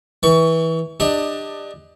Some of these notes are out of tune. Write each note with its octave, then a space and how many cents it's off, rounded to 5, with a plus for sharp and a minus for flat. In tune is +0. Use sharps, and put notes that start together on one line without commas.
E3 -20 C#6 +25
D4 +25 G4 +25 D#5 +20